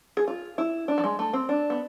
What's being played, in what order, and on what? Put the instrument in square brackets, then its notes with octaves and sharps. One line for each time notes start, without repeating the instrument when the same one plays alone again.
[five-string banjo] G#4
F4
E4
D4
F3
G#3
A3
C4
D4
B3